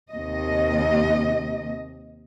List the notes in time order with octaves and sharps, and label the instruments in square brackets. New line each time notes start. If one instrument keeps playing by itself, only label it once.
[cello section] D#2 C3 D#5